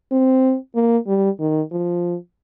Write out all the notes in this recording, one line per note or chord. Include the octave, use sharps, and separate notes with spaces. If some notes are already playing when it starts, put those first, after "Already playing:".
C4
A#3
G3
D#3
F3